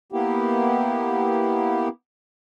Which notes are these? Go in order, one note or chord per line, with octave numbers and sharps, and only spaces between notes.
A#3 B3 E4 G4